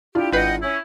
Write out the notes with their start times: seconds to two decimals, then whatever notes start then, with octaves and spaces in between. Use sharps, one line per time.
0.15 D4 E4 F4 G4
0.33 G#1 B4 D#5 F#5 G5 C7
0.62 C#4 E4